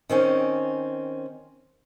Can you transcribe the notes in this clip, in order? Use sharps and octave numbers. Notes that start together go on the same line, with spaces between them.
D#3 C4 C#4